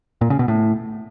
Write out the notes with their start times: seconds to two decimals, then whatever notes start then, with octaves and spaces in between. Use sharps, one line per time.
0.21 A#2
0.30 C#3
0.39 B2
0.48 A2